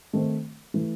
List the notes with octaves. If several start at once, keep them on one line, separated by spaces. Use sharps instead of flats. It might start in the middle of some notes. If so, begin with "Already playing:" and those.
D#3 A3 C4
E3 A3